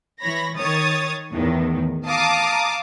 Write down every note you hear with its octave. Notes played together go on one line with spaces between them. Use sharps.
E3 C#5 B5 A#6
D#3 C#5 D#6 A6
E2 A2 D#3
F5 A5 A#5 D6 D#6